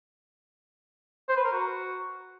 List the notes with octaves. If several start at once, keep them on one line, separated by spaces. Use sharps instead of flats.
C5
B4
A#4
F#4